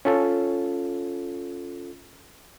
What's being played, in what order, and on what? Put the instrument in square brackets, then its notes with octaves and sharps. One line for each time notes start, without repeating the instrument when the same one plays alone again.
[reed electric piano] C#4 F4 A4